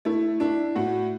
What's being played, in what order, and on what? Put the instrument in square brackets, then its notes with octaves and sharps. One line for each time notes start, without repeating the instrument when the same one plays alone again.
[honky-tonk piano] A3 [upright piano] E4
[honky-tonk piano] D4 [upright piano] E4
[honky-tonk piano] A2 [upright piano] F#4